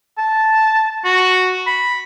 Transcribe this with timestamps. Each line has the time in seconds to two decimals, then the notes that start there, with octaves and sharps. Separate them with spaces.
0.18 A5
1.04 F#4
1.67 B5